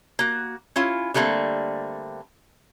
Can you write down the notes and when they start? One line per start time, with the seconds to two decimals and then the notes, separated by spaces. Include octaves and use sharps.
0.19 A#3 F#4
0.76 C#4 E4 F4
1.14 D3 G3 A3 A#3 C4